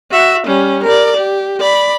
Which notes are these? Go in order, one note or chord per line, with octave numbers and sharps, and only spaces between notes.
F#4 E5
G3 C#4
A#4 D5
G4
D5 B5